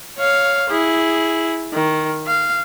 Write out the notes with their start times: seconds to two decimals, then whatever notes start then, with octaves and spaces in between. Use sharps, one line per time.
0.18 C#5 F5
0.69 E4 G#4
1.73 D#3
2.27 F5